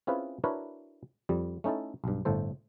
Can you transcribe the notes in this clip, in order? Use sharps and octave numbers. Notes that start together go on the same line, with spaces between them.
C4 C#4 E4 F4 G#4 B4
D4 E4 F#4 A#4 B4 C#5
F2 G3
A3 C#4 D#4 E4 A4
B1 G2
G1 A2 A4 C5